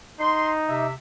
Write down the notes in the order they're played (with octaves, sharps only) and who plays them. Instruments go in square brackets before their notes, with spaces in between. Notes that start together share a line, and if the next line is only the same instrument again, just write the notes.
[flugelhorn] D#4 [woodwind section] C6
[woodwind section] C3 E5